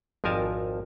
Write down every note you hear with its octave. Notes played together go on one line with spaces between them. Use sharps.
G#1 F2 F3 A#4 G#5 A5